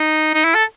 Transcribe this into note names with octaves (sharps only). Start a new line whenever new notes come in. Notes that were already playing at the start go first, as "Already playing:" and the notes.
Already playing: D#4
D#4
E4
A4